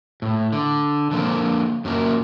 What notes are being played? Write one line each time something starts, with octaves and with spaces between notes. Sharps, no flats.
A2
D3
D3 F3 A#3 C4
F#2 A#2 A#3